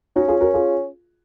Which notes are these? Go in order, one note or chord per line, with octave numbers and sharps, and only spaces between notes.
C#4 D#4 F#4
F4 G#4
F#4 A#4
F4 G#4